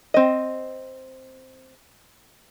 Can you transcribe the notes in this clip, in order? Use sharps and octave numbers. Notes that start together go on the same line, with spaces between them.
C4 D#5